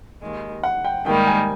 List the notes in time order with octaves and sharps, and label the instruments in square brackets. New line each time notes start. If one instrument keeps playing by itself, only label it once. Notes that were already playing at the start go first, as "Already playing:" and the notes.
[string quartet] D#2 D#3 G#3
[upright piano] F#5
G5
[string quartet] G#2 D#3 G3 A#3 [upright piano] G5
[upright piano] G#5